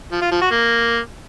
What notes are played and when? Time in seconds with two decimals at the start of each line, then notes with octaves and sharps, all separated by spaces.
0.12 F3
0.22 F4
0.32 F3
0.41 F#4
0.51 A#3